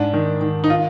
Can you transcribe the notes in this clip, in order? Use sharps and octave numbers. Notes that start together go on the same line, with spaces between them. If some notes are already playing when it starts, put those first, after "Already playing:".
Already playing: G#2 D4
D#3
D#3
D#4
F4